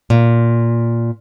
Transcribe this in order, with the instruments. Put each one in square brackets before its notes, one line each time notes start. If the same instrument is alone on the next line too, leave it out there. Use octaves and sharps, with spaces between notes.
[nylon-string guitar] A#2